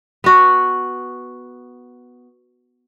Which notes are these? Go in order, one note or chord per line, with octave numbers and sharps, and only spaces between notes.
B3 F#4